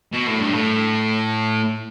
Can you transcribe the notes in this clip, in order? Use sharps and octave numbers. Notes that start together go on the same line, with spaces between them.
B2
A2
G2
A2